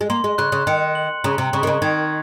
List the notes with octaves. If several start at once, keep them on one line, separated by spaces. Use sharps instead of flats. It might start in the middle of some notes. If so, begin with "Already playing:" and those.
G#3
A#3 C6
G#3
C#3 F#6
C#3
D#3 C#7
F#7
C#3 A#5
C3
C#3 C#6
D#3
C#3
D#3 G#6